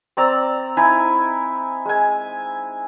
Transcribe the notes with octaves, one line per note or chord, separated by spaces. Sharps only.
C4 D5 A#5 E6
D#4 E4 G#5
G#3 G#5